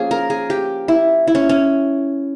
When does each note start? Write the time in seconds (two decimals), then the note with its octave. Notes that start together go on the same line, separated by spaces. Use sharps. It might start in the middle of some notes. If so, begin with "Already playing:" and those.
Already playing: F3 A#3 C#4 G#4
0.11 A#4
0.30 G#4
0.50 G4
0.88 E4
1.27 E4
1.35 C#4
1.49 C#4